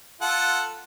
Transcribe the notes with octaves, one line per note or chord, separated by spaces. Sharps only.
F4 A4 F#5